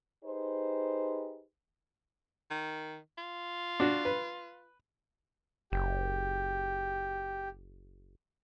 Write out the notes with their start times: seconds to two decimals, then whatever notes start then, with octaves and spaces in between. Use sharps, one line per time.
0.25 D#4 G4 G#4 B4 C5
2.50 D#3
3.18 F4
3.80 D4 F#4
4.05 B4
5.72 F#1 G4